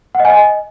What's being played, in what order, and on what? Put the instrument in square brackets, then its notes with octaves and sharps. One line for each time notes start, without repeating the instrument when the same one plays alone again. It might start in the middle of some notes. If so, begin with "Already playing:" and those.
[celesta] F#5
D#5
G#5
D#5